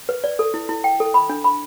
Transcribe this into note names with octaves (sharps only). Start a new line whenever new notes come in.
B4
D5
A4
E4
E4
G5
A4
B5
D4
B5